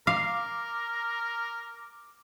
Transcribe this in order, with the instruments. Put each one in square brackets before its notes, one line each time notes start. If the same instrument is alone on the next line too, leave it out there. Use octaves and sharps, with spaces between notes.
[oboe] A#4 [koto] F5 [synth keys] D6